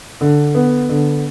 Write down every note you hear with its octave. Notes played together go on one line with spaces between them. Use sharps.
D3
B3
D3